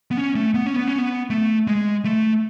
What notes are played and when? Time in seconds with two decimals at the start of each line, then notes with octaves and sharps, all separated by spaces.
0.11 B3
0.17 C#4
0.35 A3
0.54 B3
0.66 C#4
0.76 B3
0.88 C#4
0.98 B3
1.30 A3
1.68 G#3
2.05 A3